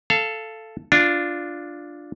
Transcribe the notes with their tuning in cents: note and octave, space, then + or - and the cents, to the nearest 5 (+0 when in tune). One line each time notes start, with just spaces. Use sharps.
A4 +0 F5 -20
D4 +0 F4 +0